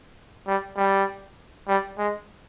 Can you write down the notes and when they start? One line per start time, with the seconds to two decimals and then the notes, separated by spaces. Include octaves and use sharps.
0.47 G3
0.77 G3
1.68 G3
1.98 G#3